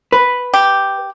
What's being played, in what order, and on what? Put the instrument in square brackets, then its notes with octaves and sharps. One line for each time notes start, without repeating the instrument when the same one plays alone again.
[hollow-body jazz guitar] B4
[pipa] G4